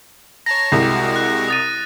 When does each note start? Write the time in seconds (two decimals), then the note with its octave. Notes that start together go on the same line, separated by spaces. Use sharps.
0.46 C#5 A5 A#5 A#6
0.72 C2 G#3 F#4 G4
1.16 F#6
1.48 D#6 A6 D#7